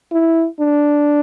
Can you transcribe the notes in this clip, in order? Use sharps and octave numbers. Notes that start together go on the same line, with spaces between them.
E4
D4